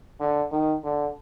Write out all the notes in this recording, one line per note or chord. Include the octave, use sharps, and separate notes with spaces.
D3
D#3
D3